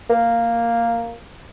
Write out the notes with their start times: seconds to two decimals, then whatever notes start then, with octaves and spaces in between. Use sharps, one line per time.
0.10 A#3